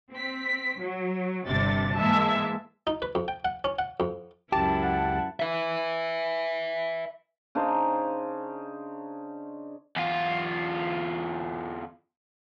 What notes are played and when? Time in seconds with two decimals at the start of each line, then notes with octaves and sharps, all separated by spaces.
0.12 C4 B6
0.79 F#3
1.47 G1 G2 C3 D4 A6
1.96 G#2 E3 G#3 A#3 E5 A5
2.87 D#4
3.02 B4
3.15 F2
3.28 G5
3.45 F#5
3.64 C#4
3.79 F#5
4.00 F2
4.52 C#2 F#2 E4 G4 A5
4.83 F#5
5.40 B4 E5
7.55 C#3 D4 D#4 C5
9.96 E2 F4